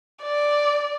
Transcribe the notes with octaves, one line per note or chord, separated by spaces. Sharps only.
D5